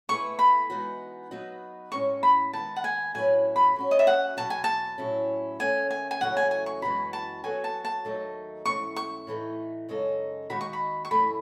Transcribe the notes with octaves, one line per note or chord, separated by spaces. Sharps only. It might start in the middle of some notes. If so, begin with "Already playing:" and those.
B2 A3 E4 G#4 B4 C#6
B5
E3 G#3 B3 D#4 F#4
F#3 B3 D#4 F#4 B4
A2 G#3 C#4 C#6
B5
D#3 G#3 B3 A5
F#5
G#5
A2 F#3 C#4 E4 B4 G#5
B5
F#3 C#4 F#4
D#5
E5
F#5
E2 B2 F#3 A5
G#5
A5
A2 F#3 C#4 E4
D#3 A3 C#4 G#4 G#5
G#5
G#5
E2 C#3 F#3 A3 D#4 F#5
G#5
G#5
C#6
F#2 E3 G#3 B3 F#4 B5
A5
F#3 B3 F#4 A4 G#5
A5
A5
D#2 D#3 F#3 A3 D#4
G#2 E3 A3 C#4 C#6
C#6
A2 E3 A3 D#4
F#2 C#3 G#3 D#4 A4
D#2 D#3 G#3 D#4 F#4 B5
C#6
B5
C#6
F#2 E3 A3 B5